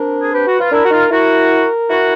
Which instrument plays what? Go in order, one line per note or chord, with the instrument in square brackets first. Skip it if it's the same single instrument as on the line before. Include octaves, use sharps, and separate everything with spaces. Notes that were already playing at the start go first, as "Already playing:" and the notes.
Already playing: [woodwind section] C4 D4 [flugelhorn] A#4
[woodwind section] G#4
[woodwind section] G4 [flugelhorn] B4
[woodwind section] F#4
F4
[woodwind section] D4 E4 [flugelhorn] A#4
[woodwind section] F#4
D#4 F4
[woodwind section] E4 F#4 [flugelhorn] A#4
[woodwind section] E4 F#4